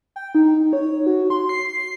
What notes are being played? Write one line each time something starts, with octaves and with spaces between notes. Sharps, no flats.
G5
D#4
C#5
F#4
C6
C7